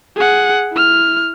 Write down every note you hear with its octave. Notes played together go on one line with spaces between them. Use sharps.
G#4 F#5
E4 F6